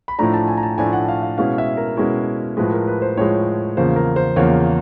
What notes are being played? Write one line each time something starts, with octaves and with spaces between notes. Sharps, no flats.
B5
A2 F3 A3 D4 A#5
A5
G#5
A#5
A5
A2 F3 A3 D4 G#5
F#5
F5
F5
B2 G#3 C#4 E4 F5
E5
A#4
B2 G#3 C#4 E4
A2 F3 G#3 B4
A#4
B4
C5
A2 F3 G#3 C#5
E2 C#3 F3 A#3 C5
A#4
C5
E2 C#3 F3 A#3 C#5